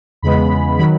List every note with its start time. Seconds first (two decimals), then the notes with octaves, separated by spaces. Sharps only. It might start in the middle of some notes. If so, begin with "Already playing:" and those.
0.22 E2 C#3 G#3 B3 B5
0.78 D#3 F#3 B5